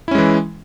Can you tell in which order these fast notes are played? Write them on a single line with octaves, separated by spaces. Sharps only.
E4 C#4 G#3 E3